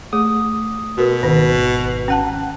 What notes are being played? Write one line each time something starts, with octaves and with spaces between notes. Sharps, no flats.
A3 G#4 D#6
B2 F#4 A#4 B4
G#1 D#3
C#4 F#5 G5 A5 F#6